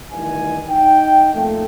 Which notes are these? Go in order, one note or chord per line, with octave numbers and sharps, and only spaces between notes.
D2 G2 D#3 E3 G#5
D#4 G5
F2 A#2 A3